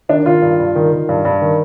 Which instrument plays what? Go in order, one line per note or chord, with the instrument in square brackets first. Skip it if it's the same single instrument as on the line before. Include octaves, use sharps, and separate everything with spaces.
[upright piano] D#3 D4
D#3 F4
G2
G2
D#3
D#3
G2
G2
D#3